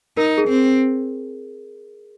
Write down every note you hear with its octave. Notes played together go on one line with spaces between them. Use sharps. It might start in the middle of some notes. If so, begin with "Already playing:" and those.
D#4 A#4
G#4
C4